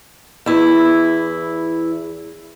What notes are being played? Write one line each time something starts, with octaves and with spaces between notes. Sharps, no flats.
E2 E4